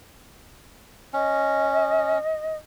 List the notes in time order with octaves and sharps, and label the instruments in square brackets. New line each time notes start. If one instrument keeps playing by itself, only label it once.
[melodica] C#4 [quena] D#5